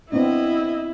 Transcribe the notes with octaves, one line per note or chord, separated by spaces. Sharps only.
B3 C4 D4 E4 D#5